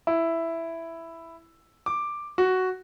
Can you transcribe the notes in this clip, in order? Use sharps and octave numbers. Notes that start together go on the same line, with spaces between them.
E4
D6
F#4